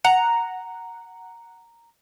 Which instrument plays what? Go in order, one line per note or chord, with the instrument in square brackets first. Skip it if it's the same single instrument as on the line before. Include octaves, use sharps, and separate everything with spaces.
[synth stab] F#5 [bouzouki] A#5